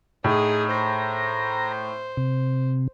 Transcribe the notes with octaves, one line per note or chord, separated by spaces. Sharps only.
A2 D#4 G#4
C5 A#5
C3